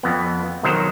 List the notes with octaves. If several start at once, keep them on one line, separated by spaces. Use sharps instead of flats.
F2 B3
B1 D#3 F#3 C5 A#5